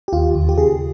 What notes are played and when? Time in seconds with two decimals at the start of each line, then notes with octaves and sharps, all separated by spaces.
0.08 G4
0.13 D#2 F4
0.35 D#2
0.49 G4
0.58 C#3 G#4